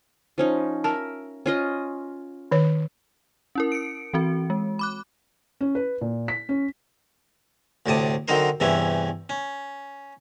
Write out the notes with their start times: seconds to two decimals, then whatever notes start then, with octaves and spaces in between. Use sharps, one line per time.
0.38 F3 C#4 D#4
0.84 A#4 E5 A5
1.46 C#4 F4 D#5
2.51 D#3 C#5
3.55 C#4 E4 A#4
3.72 C#7 D7
4.14 E3 C4 F#4
4.50 G#3
4.79 B5 D6 F#6
5.61 C#4
5.75 B4
6.01 A#2
6.28 B6
6.49 C#4
7.86 D2 A2 C3 D5 A5 D#6
8.28 D3 F#3 C4 D#4 A#4 C5
8.60 E2 G2 C3 E3 C#4 E5
9.29 C#4